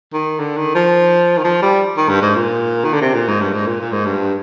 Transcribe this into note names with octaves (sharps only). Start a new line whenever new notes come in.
D#3
D3
D#3
F3
D#3
F3
G3
D#3
G2
G#2
A#2
D#3
D3
C3
A#2
G#2
G2
G#2
A#2
A#2
G#2
G2